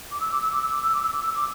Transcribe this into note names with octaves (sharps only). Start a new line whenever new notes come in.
D6
E6
D6
E6
D6
E6
D6
E6
D6
E6
D6
E6
D6